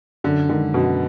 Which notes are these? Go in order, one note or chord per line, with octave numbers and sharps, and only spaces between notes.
F#2 D3
D3 D#3 G#3 D#4
F#2 B2